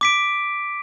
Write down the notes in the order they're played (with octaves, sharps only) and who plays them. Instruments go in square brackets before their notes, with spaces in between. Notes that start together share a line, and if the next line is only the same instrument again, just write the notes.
[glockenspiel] D6 B6 D7